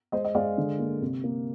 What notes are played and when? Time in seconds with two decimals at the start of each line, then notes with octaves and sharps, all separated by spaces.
0.12 G#3 C5 D#5
0.25 D#5
0.35 G#3 D5 F5
0.58 D3
0.79 A#3
1.02 C3
1.24 A#3